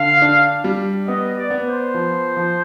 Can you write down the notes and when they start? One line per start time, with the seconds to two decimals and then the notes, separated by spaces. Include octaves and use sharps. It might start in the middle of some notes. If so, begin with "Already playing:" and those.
Already playing: D3 F5
0.22 D4
0.64 G3
1.08 B3 D#5
1.37 D5
1.50 B3
1.66 C5
1.94 F3
2.37 F3